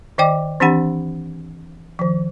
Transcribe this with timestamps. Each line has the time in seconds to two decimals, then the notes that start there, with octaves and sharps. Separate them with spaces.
0.18 D#3 D5 D#5 G5 D6
0.60 E3 C4 D4 G4 F#5 B5
1.99 D#3 F3